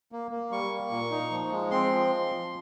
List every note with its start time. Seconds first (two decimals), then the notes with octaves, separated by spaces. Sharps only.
0.12 A#3
0.31 A#3
0.51 G3 C#6
0.72 A#3
0.91 A#2
1.11 D#4
1.31 F3
1.51 G#3
1.71 C4 C6
1.92 F3